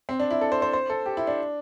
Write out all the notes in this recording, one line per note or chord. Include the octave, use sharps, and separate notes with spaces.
C4
D4
E4
A4
C5
C5
C5
A4
G4
E4
D4